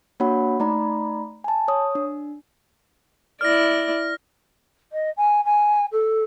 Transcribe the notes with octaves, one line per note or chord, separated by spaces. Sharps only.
A#3 D4 F#4 C#5 F#5 B5
A3 D#4 D5 A#5 B5
G#5 A5
C#5 D#6
D4
E4 D5 F6 A#6
D#5
G#5
G#5
A4